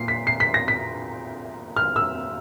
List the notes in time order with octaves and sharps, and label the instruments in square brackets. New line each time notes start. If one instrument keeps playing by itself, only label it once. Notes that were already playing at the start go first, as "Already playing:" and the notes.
Already playing: [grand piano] A#2 C7
B6
C7
B6
A#6
B6
F6
E6